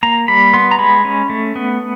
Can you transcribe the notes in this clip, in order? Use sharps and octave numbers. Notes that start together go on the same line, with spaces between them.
A#3 A#5
G3 B5
B3 C6
A#5
G#3 B5
C#4
A3
B3